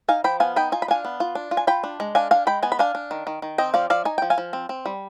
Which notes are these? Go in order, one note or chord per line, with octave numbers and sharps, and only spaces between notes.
D#4 F5 G#5
F3 G5 B5
B3 F5 G#5
D#4 G5 B5
F4 G#5
B5
D4 F5 G#5
B3
F4
D4
F4
G#5
F4 G5 B5
D4
G#3
D4 F5 G#5
D4 F5 G#5
G#3 G5 B5
B3 G#5
B5
D4 F5 G#5
D4
D#3
D#3
D#3
C4 D#5 G5
F3 D5 F5
F3 D5 F5
D#4 G#5
F3 G5
F5 G#5
F3
C4
C4
G3